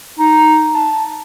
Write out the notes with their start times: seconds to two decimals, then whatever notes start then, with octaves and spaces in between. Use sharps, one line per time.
0.19 D#4
0.74 A5